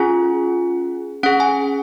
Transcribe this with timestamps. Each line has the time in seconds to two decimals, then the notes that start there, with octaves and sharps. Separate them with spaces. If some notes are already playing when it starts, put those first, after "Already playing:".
Already playing: C#4 F4 G#4 G#5
1.23 C#4 G#4 F#5
1.40 G#5